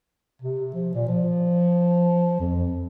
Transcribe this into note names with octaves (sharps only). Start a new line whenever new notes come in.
C3
F3
A#2
F3
F2